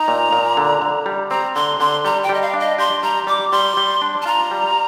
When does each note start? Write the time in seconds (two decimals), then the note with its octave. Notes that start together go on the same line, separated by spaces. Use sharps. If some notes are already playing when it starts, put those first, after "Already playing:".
Already playing: D#4 A#5
0.08 A#2
0.33 A#2
0.57 D3
0.82 D3
1.06 G3
1.31 C4 A#5
1.55 D3 C6
1.80 D3 C6
2.05 G3 A#5
2.23 G5
2.29 G3 D#5
2.42 F5
2.53 D4
2.60 D#5
2.78 G4 C6
3.03 G3 A#5
3.27 G3 D6
3.52 G3 C6
3.77 G3
4.02 D4
4.22 A5
4.26 F4 A#5
4.51 G3